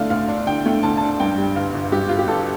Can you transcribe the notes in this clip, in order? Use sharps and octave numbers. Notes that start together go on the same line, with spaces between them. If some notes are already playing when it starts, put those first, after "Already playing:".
Already playing: D3 A3 D5 F5
D2 F5
D4
D3 G5
A3
D2 A5
D4 A5
G2 G5
G3
G1 F5
G1
G2 G4
G3 F4
G4
G1 A4